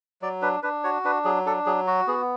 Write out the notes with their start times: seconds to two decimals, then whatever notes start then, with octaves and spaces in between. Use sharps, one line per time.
0.22 F#3 D5
0.42 D4 B4
0.63 D4 B4
0.84 F#4 C#5
1.05 D4 B4
1.25 F#3 G#4
1.46 D4 A4
1.66 F#3 G#4
1.87 F#4
2.07 B3 G#4